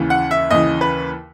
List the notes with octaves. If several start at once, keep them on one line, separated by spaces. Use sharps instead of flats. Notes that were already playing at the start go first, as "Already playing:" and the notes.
Already playing: D#2 C#3 E3
F#5
E5
D#2 C#3 E3 D#5
B4